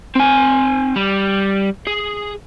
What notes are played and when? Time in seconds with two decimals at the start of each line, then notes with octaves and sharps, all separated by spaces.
0.15 C4 G#5
0.96 G3
1.87 G#4